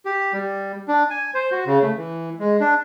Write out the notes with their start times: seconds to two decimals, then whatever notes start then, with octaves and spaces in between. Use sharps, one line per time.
0.05 G4
0.33 G3
0.88 D4
1.10 G#5
1.34 C5
1.52 F#4
1.66 C#3
1.82 A3
1.97 E3
2.39 G#3
2.60 D4